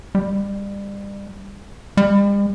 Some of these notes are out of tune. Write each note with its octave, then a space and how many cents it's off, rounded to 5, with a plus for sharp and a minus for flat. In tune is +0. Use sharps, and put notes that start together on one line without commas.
G3 +30
G3 +45